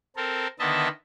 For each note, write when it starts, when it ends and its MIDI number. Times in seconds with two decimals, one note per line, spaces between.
0.16 0.47 60
0.16 0.47 69
0.16 0.47 70
0.59 0.88 50
0.59 0.88 51
0.59 0.88 59
0.59 0.88 75
0.59 0.88 76
0.59 0.88 81